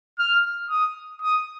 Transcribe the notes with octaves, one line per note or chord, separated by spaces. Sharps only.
F6
D#6
D#6